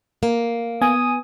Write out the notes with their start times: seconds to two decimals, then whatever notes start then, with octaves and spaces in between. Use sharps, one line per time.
0.23 A#3
0.81 B3 G#5 D#6